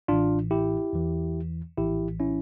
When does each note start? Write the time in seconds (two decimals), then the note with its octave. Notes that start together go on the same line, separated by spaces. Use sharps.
0.08 A1 A2 E3 D4 F4
0.51 E4 G4
0.93 E2 E3
1.77 A#1 A2 E3 E4 G4
2.20 C#4 E4